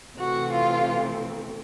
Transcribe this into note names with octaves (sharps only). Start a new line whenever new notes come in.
C3 E3 A3 C4 F#4
F4